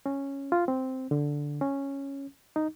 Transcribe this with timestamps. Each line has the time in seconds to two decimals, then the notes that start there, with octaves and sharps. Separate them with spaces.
0.06 C#4
0.52 F4
0.68 C4
1.11 D3
1.61 C#4
2.56 D#4